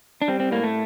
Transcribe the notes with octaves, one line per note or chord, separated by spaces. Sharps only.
D4
G3 C4
C4
A2 A#3
A3